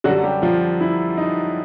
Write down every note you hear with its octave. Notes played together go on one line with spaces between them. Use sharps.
F#2 D3 F#3 G3 F#4
G3 G4
F3 F4
E4
D#4